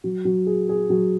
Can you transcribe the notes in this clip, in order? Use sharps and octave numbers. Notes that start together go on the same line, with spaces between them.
F#3
F#3
G#4
G#4
F#3